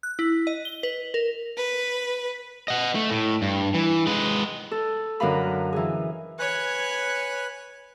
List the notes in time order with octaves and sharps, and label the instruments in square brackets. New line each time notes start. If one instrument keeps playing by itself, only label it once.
[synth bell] F#6
E4
D#5
G7
B4
A#4
[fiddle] B4
[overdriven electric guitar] D#5 F#5
A3
A2
G2
E3
G#3 B4
[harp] A4
F#2 D3 A#4 D#5 F5 B5
E3 G#4
[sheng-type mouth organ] B4 G#5 F#6 [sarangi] C#5